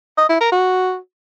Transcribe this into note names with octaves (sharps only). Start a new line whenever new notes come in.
D#5
E4
A#4
F#4